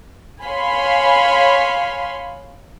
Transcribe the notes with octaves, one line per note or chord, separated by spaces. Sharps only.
C#5 F5 G#5 B5 C6